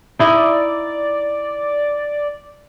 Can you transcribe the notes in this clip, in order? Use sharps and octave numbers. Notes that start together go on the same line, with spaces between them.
D#4 E4 D5 D#5